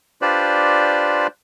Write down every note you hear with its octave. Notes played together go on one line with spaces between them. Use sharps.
D4 F4 G4 B4 C5 D5